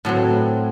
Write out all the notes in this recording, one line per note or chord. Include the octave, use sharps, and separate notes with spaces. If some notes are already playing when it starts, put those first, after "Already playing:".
A2 F#3 C4